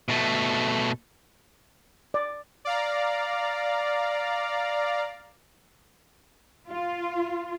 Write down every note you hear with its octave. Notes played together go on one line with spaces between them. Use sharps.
B2 A3
D5
D5 F5 A#5
F4